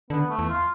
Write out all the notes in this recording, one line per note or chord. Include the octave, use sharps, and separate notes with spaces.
D3 B3
A3
E2
F4